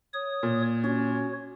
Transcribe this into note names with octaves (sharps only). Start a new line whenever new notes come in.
C#5 D#6
A#2
C#4 F#4 C#5